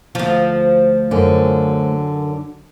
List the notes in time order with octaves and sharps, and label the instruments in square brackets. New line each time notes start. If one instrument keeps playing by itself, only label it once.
[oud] D2 F3
[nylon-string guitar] F#2 D3